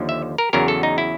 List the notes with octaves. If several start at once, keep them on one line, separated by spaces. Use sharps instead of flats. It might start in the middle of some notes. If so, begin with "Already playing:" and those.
Already playing: D#2 D3 F3
E5
A#4
E2 C#3 F#3 A#4
A4
D#4
E4